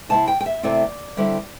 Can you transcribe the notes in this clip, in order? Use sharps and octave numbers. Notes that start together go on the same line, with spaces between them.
C3 A3 C4 E4 A5
G5
G5
E5
C3 A3 C4 E4 D5
D3 G3 C4 E4